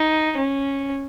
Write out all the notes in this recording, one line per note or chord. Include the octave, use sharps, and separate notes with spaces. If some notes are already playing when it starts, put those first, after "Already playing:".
Already playing: D#4
C#4